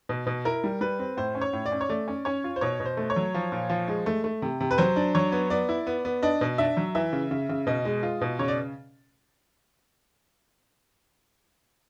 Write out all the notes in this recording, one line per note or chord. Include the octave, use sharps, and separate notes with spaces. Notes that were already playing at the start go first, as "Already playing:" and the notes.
B2
B2
E4 A#4
G3
G3 B4
C4
A2 C5
C#4
C#5
A2
D5
C#4
C#5
A3 D5
C#4
C#4 C#5
F4
C5
B2 C#5
B2
C5
A3
C#5
F#3
F3
A#2
F3
G#3
A3
A3
C3
C3
B4
F#3 C5
D4
F#3 C#5
B3
B3 D5
E4
B3
B3
D4 D#5
B2
D4 E5
F#3
E3 E5
C#3
C#3
C#3
B2 D#5
G#3
F4
B2
C#3 C#5
D5